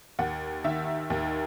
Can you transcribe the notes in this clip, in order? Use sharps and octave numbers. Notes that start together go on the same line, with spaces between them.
D#2 F#5
D#3 E5
D#2